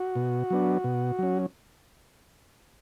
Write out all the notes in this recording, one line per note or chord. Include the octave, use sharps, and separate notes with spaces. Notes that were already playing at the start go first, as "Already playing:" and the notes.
Already playing: F#4
B2
F#3 B3 D4
B2
F#3 C#4